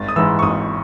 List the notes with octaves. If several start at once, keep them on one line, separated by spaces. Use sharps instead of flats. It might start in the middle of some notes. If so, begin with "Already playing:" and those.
Already playing: G#1 A6
D#6
G#2 E3 E6
C#6
G#1 D#6